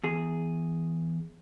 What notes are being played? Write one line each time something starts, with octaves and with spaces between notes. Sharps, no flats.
E2 G#4